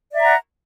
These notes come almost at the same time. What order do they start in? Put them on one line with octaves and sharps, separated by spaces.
D5 E5 A#5 F#5